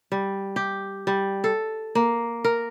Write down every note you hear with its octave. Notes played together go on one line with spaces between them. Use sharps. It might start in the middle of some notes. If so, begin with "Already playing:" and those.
G3
G4
G3
A4
A#3
A#4